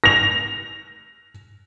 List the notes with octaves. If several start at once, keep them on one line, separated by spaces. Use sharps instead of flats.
A#6 F7